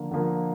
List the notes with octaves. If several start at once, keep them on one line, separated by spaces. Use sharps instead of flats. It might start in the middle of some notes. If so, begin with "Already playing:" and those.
Already playing: D3 F3 A#3
D3 F3 A#3